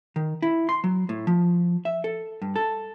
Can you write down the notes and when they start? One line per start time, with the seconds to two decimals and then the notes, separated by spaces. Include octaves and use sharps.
0.16 D#3
0.42 E4
0.69 C6
0.84 F#3
1.09 A2
1.27 F3
1.85 E5
2.04 A4
2.42 G2
2.56 A4